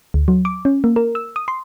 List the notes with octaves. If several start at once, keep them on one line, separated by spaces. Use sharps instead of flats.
D2
F#3
D6
C#4
A#3
A#4
E6
D#6
C6